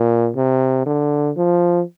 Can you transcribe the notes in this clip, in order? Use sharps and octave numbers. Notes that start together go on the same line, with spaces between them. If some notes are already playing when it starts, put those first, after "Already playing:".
Already playing: A#2
C3
D3
F3